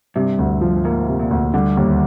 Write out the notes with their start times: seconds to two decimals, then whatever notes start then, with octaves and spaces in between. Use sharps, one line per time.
0.16 G2 C3
0.39 D2
0.61 F3
0.84 G#2 A#3
1.08 C3
1.19 A#2
1.31 D2
1.54 D3 G3
1.77 D#2